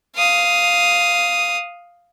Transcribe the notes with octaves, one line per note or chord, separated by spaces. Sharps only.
F5 D#6